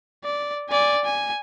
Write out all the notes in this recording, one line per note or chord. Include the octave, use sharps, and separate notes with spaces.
D5
D5 G#5
G#5